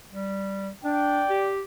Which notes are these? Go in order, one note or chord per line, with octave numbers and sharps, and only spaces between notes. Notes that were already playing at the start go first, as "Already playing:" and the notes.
G3
D4 D5 G5
G4